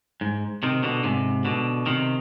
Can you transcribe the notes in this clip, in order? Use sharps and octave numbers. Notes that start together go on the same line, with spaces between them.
G#2
C3 D#3
B2 D3
G#2 C3
B2 D3
C3 D#3